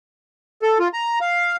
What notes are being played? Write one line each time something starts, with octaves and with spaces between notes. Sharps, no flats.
A4
F4
A#5
F5